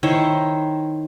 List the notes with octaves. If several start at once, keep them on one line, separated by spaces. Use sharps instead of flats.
D#3 E4 C5 C#5